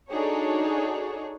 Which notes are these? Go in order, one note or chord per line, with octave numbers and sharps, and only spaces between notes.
D4 D#4 F#4 G#4 A4 C#5